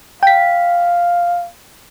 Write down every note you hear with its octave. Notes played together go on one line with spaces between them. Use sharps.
F5 G5 B6